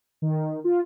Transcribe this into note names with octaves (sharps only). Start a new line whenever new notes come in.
D#3
F4